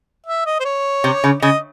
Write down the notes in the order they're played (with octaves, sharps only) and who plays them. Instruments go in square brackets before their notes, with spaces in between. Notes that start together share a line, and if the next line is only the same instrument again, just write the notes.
[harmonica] E5
D#5
C5
C#5
[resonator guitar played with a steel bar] C3
C#3
[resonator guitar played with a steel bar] C#3 [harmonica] D#5